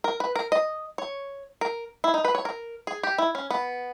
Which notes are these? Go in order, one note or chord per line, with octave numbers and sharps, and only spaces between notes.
A#4
B4
A#4
D#5
C#5
A#4
E4
D#4
B4
C#5
A#4
G#4
G4
E4
C#4
B3